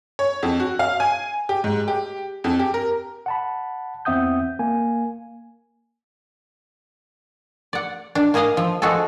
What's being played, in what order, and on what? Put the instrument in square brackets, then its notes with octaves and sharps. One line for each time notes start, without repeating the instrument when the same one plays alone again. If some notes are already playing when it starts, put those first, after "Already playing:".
[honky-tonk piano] C#5
F2
F#4
F5
G#5
G4
G#2
G4
F2
G4
A#4
[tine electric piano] F#5 A5 B5
E2 C4 E5 F#5 D#6 G6
A#3 G#5
[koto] D5 F#5
D4
A#3 G#4 A#4 D#5 F5
F3
F3 G#3 F#4 G#4 A4